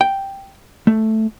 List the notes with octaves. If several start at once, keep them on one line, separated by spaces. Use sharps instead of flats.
G5
A3